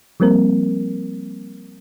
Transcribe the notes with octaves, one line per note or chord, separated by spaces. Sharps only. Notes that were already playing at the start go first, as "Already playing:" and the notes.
F3 G3 A#3 C4 A#4